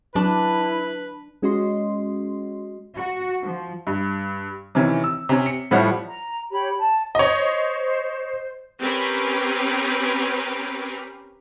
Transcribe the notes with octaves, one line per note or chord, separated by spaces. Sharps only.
F#3 D4 E4 B4
G#3 C#4 F#4 D#5 C6
F#4
F3
G2
C3 D#3 E3 C#4
E6
C3 C#4
C#7
A2 F3 G3 C#5 F#5
A#5
G4 C#5 B5
A5
C5 C#5 D#5
C4 C#4 G4 A#4 B4